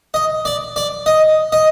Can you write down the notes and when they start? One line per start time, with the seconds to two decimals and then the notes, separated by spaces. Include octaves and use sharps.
0.14 D#5
0.45 D5
0.76 D5
1.06 D#5
1.52 D#5